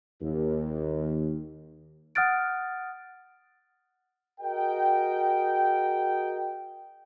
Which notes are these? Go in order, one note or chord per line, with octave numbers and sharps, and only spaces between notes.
D#2
F#5 D#6 F6 F#6 A6 D7
F#4 G#4 A#4 D#5 G5